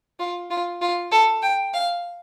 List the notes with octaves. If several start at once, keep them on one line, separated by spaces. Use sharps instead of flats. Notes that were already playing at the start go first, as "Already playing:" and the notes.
F4
F4
F4
A4
G5
F5